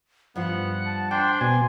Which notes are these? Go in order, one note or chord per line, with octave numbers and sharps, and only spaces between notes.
G2 F3 B3 F4 F#5
A5
D4 C5 G5 C6
B2 G#5